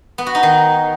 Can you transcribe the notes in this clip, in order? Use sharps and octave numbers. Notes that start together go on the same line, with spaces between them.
B3
F#4
D#4
D#3